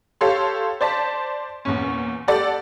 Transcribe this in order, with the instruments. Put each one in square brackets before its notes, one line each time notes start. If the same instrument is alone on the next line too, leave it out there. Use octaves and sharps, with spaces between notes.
[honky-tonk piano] G4 A4 C#5 F5 C6
C5 D5 A5 B6
E2 A#2 C#4
G4 A4 D5 F#5